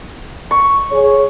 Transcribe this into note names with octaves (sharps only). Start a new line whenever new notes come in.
C#6
G#4 C#5